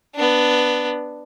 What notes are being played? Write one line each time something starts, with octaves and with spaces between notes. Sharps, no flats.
B3 D4